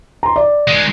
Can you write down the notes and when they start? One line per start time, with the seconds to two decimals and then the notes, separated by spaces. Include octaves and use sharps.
0.23 A#5 C6
0.36 D5
0.68 D#3 G#3